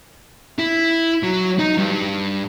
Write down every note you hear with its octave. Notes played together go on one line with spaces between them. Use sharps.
E4
F#3
D#4
G2